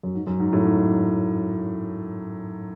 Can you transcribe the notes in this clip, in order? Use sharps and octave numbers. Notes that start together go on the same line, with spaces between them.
F#2
G#2
F#2
G#2
F#2 A2
G#2